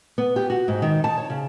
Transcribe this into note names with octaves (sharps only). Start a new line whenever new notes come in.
B3
G4
F#4
G#2
D#3
A5
C#5
C#3